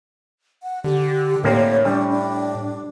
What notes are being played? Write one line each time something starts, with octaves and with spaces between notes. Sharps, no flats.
F#5
D3 G4
A2 D3 A#3 C4 C#5
G3 D4
D4